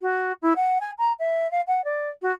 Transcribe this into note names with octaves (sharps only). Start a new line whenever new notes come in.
F#4
E4
F#5
G#5
A#5
E5
F5
F#5
D5
F#4